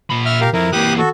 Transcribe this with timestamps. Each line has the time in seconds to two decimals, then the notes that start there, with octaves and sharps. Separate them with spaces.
0.10 A#2 B5
0.25 E5 F6
0.41 G4 A#4 F5
0.53 F2 E4 A#4
0.72 E3 A#3 G4 D#6 F#6
0.98 F#4 A4